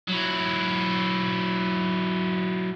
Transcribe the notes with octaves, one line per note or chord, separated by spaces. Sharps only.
F#3 E4